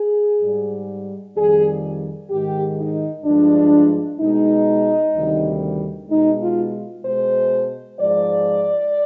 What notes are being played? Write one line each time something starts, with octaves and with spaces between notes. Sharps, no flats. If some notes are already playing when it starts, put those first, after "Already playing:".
Already playing: G#4
G#2 G3
F2 D#3 G3 G#4
G#2 D#3 G#3 G4
D#4
G2 F3 G#3 D4
B2 G#3 D#4
D2 C3 D#3 G3
B2 G#3 D#4
F4
B2 G#3 C5
G#2 F3 G#3 D5